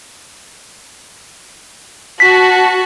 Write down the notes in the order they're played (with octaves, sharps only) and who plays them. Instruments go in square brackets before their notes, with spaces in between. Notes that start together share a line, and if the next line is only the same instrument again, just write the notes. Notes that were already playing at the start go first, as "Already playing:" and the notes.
[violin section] F#4 A5 [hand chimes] B6